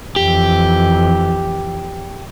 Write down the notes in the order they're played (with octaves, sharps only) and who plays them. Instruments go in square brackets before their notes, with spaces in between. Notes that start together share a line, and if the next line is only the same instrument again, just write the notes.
[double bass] F2 E3 [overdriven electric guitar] G4